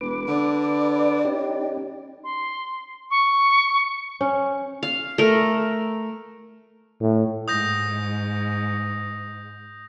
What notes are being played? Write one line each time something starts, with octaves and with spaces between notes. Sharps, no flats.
E1 B4 D6
D3 D5
C#4 D#4 G4
C6
C#6
C#4
F5
A3 A#4
A2
G#2 D#6 G6 A#6